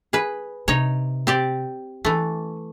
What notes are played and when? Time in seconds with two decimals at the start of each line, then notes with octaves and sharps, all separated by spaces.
0.13 G#4 B4
0.68 C3 D#4 C#5
1.27 C4 G4 D5
2.05 E3 A3 C#4